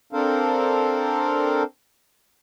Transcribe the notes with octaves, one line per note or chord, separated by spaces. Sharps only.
C4 D4 A4 A#4 C5 F5